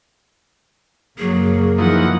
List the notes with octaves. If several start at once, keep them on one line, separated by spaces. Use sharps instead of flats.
F#1 F#3 A#3 G#4
E3 F3 D#4 F#5